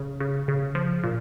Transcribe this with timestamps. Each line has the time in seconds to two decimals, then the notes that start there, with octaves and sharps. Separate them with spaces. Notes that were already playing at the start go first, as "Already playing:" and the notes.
Already playing: C#3
0.20 C#3
0.48 C#3
0.75 F3
1.04 A#2